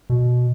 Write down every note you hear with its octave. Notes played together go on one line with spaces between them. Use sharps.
B2